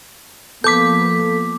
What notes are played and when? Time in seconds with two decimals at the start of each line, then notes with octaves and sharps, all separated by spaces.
0.64 F3 A#3 B3 A4 D6 G6 B6